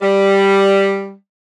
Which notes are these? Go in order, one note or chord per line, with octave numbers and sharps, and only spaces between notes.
G3